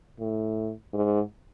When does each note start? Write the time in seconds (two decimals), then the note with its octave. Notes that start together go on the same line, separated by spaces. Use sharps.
0.19 A2
0.94 G#2